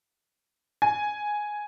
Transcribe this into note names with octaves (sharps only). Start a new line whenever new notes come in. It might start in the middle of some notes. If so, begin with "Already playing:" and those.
G#5